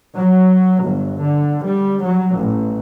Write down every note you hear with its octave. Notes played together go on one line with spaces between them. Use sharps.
F#3
G1
D3
G3
F#3
A1